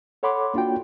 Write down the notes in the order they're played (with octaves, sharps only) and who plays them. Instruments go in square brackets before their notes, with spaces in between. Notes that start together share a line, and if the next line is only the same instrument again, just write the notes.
[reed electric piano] A4 C#5 F#5 B5 C6 D6
A#3 D4 F4 F#4 G5